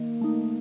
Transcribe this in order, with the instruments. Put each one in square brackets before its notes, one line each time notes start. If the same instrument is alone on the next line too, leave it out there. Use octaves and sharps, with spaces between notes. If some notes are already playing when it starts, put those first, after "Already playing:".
Already playing: [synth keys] D#3 [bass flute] A#3
[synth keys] A3 D#4